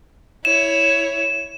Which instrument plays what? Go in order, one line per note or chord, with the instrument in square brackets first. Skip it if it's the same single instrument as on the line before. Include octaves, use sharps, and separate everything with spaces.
[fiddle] E4 C#5 [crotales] E7